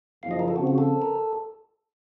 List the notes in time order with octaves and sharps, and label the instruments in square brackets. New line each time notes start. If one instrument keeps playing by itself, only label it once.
[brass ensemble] F#1 F#2 F3 [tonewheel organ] F5
[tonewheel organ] D#5
A#4
A4
[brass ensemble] C#3 F3 C4 [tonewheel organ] F#4
[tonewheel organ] F#4
A4
A#4